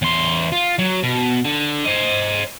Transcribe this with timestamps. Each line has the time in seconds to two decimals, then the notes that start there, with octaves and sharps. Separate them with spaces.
0.02 E2 C6
0.52 F4
0.79 F#3
1.03 B2
1.45 D3
1.85 C5 D#5